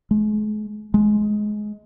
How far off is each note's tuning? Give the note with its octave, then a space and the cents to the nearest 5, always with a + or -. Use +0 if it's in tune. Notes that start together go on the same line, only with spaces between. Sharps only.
G#3 +40
G#3 +15